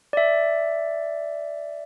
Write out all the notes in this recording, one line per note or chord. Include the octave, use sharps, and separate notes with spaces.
D5 E5